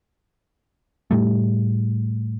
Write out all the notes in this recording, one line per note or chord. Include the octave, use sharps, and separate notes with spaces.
A2 G3 A3